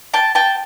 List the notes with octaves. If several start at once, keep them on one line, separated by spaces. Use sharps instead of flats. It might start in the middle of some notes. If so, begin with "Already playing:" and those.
G5 A5
G5 A5